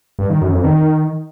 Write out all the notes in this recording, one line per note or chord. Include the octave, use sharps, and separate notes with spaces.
G2
D#3
F#2
F2
D#3